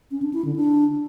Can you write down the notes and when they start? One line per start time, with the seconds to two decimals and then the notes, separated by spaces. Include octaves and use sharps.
0.11 C#4
0.22 D4
0.34 E4
0.45 D3
0.56 D4